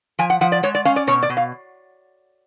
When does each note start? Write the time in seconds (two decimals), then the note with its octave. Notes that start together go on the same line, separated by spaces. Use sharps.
0.19 F3 G#5
0.30 F#5
0.41 F3 F#5
0.52 D5
0.63 G#3 C#5
0.75 D5
0.85 C#4 F5
0.96 D5
1.07 B2 C#5
1.23 D5
1.30 B2
1.37 F5